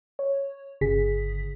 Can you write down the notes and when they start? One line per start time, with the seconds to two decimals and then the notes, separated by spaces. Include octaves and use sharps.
0.19 C#5
0.81 G1 C#3 G#4 B6